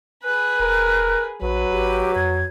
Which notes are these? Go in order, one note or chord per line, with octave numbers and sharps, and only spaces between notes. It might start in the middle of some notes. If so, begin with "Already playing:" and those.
G#4 B4 F#6
E1 A#4
A#1 F#3 B4
G#1 G4
F2 G#6